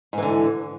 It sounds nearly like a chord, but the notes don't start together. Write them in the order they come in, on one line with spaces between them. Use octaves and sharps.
G#2 E3 D3